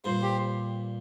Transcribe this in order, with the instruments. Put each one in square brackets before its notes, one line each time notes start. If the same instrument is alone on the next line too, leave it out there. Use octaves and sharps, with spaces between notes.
[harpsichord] G2 A#2 [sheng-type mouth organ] C5
[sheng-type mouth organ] G4